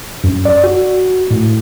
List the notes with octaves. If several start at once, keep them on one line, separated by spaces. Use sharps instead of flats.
F#2
D5
F#4
A2